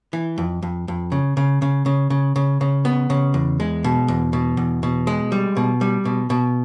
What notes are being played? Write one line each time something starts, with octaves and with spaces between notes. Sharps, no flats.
E3
F2
F2
F2
C#3
C#3
C#3
C#3
C#3
C#3
C#3
B3
C#3
E2
G#3
B2
E2
B2
E2
B2
G#3
G3
B2
G3
B2
B2